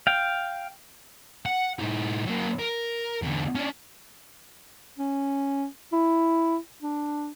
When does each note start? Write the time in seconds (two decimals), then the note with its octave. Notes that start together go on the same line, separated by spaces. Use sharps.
0.07 F5 G5
1.46 F#5
1.79 A2 D#4
2.26 F#3 A#3
2.59 A#4
3.22 E2 D3
3.55 C#4 D4
4.98 C#4
5.92 E4
6.82 D4